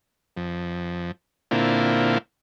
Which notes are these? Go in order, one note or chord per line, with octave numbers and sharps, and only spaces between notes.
F2
A#2 D3 A#3 C4 E4 F4